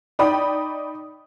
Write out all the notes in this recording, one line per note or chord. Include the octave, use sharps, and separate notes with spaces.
D#4 D5 G5 B5 D#6